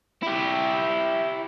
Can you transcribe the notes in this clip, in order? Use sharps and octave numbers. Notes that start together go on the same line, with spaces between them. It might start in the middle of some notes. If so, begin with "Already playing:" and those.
E4 G4